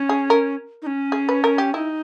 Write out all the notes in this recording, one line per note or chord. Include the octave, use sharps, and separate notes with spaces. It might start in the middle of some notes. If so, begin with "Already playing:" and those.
Already playing: C#4
G#4
A#4
D#4
C#4
G#4
B4
A#4
G4
D#4 E4